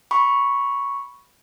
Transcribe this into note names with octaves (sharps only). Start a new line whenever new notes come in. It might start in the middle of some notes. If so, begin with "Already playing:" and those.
B5 C#6